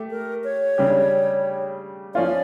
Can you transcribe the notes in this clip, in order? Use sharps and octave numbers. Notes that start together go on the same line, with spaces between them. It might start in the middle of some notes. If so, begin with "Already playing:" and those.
Already playing: A3 G4
A#4
C#5
C#3 G3 D4 G4
F3 C#4 F4 D5